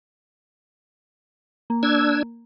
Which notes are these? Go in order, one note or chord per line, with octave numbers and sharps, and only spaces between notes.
A#3
D4 E6 G#6